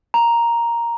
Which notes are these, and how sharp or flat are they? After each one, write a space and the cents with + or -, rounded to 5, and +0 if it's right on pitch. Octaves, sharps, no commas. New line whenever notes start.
A#5 +5